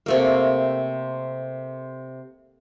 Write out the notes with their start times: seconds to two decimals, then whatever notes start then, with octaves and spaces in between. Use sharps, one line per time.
0.06 C3 A3 A#3